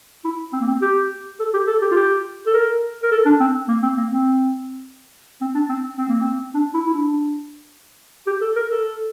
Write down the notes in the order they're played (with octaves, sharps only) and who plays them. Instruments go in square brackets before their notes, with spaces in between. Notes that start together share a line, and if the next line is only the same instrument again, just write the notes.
[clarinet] E4
C4
A#3
C4
G4
A4
G4
A4
G4
F4
G4
A4
A#4
A#4
A4
D4
C4
A#3
C4
A#3
C4
C4
D4
C4
C4
A#3
C4
D4
E4
E4
D4
G4
A4
A#4
A4